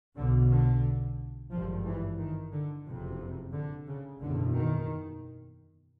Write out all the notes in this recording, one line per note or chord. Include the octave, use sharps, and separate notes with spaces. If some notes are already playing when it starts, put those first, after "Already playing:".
B1 B2 D3
D3
G#1 G2 F3
E3
D#3
D3
F#1 F2 C3
D3
C#3
F#1 E2 B2 D3
D#3